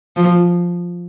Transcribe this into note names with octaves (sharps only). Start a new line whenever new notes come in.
F3